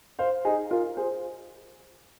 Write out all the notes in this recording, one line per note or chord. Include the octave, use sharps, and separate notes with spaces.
C5 F5
D#4 G#4
F4 A#4
G#4 C5